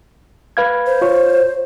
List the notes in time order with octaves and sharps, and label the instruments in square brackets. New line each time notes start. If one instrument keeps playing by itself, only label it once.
[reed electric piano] B4 F5 G#6
[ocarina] C5
[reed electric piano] F4 C#5